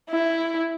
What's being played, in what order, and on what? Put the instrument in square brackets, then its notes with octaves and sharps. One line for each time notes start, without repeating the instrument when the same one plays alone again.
[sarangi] E4